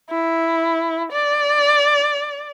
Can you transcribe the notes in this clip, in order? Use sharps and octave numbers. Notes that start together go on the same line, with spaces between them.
E4
D5